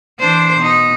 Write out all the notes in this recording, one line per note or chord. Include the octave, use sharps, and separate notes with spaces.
E3 D4 C5
B2 D#4